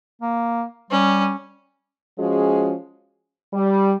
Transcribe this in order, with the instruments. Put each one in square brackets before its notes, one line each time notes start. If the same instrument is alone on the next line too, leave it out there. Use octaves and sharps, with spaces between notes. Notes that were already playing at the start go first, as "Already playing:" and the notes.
[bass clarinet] A#3
[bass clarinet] G3 [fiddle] C#4
[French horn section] F3 G#3 C#4 F#4 G#4
G3